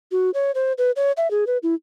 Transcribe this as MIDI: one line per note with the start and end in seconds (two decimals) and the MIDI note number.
0.12 0.30 66
0.34 0.51 73
0.55 0.73 72
0.78 0.91 71
0.96 1.12 73
1.17 1.30 76
1.31 1.44 68
1.47 1.58 71
1.63 1.74 64